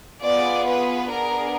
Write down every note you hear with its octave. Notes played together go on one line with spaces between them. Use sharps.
B3 F4 G#4 D5
B4
B3 D4 G#4 A#4